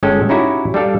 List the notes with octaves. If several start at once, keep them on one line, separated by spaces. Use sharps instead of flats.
G1 G#3 C#4 A4 G5
C#4 D#4 E4 F#4 G4
G3 D4 A4 F5